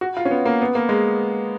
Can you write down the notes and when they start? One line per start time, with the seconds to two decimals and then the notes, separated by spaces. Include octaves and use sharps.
0.01 F#4
0.17 F4
0.25 C#4
0.31 B3
0.45 A#3
0.61 B3
0.75 A#3
0.89 G#3